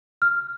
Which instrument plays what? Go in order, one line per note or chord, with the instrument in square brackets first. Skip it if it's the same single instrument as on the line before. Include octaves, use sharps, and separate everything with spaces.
[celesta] F6